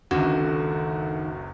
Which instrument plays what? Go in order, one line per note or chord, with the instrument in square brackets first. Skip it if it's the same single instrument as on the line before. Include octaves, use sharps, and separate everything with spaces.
[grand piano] F#1 C#2 F#2 [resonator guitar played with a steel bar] D3 [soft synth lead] D#3 [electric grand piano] F#4